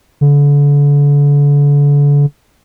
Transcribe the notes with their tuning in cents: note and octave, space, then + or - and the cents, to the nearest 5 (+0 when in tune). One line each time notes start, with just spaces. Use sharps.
D3 -35